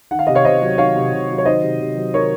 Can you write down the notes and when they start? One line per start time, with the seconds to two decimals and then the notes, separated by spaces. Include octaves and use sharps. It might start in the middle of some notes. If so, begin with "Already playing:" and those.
0.11 D#3 F#5
0.19 F5
0.27 C3 D#5
0.35 C#5 F5
0.45 C3 C5 D#5
0.62 F#3
0.78 D#3 C#5 F5
0.96 C3
1.12 C3
1.30 F#3
1.38 C#5
1.46 D#3 C5 D#5
1.63 C3
1.80 C3
1.96 F#3
2.14 D#3 A#4 C#5